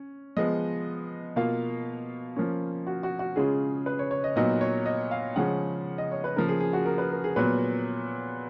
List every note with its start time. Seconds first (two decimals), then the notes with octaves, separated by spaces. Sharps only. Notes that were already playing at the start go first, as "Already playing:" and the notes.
Already playing: C#4
0.37 F3 G#3 B3 D#5
1.36 B2 A#3 F4 F5
2.36 F3 A#3 C#4
2.87 F#4
3.03 F#4
3.19 F#4
3.36 C#3 G#3 C#4 F4 G#4
3.86 B4
3.99 C#5
4.11 C#5
4.24 D#5
4.36 A#2 F#3 B3 D#4 D#5
4.61 C#5
4.86 D#5
5.11 F5
5.36 C#3 F3 G#3 C#4 F#5
5.98 D#5
6.12 C#5
6.24 B4
6.36 C#3 F3 A#3 A#4
6.48 G#4
6.61 G#4
6.73 F#4
6.86 A#4
6.98 B4
7.11 A#4
7.24 G#4
7.36 A#2 F#3 B3 B4